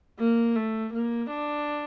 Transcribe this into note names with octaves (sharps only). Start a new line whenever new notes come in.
A#3
A3
A#3
D4